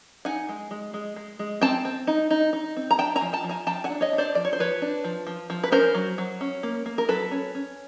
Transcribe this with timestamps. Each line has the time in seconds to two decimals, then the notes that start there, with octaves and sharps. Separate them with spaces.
0.25 D#4 F#5 G#5
0.49 G#3
0.71 G#3
0.94 G#3
1.16 G#3
1.39 G#3
1.61 C4 G5 A5
1.85 C4
2.07 D#4
2.31 D#4
2.53 D#4
2.77 C4
2.91 A#5
2.98 D4 G5 A5
3.16 G#5 A#5
3.21 F3
3.33 G5 A5
3.44 F3
3.49 G#5 A#5
3.67 F3 G5 A5
3.84 F#5 G#5
3.90 D4
4.01 C#5 D#5
4.13 D4
4.18 C5 D5
4.35 F3 D5
4.45 C#5
4.53 C5
4.59 F3 B4 C#5
4.82 D4
5.04 F3
5.27 F3
5.50 F3
5.64 B4
5.72 C#4 A#4 C5
5.95 F#3
6.18 F#3
6.41 C#4
6.63 A#3
6.86 A#3
6.98 A#4
7.09 F#3 A4 B4
7.31 C#4
7.55 C#4